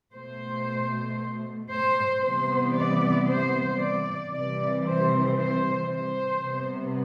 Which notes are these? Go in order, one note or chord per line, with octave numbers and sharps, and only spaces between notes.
B2 A3 C5
C5
C3 E3 G3 B3 C5
D5
C5
D5
C3 E3 G3 D5
C5
C5
C5
C3 G3 B3